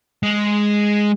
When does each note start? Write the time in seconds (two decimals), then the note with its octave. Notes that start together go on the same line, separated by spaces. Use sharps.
0.23 G#3